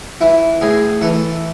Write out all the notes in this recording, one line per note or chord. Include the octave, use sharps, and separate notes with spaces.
E3 E4
A2 G#4
E3 A4